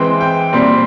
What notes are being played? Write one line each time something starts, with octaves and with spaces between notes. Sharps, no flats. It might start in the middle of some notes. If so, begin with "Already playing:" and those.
Already playing: E3 G#3 C4 G5
G5
A#2 G3 C4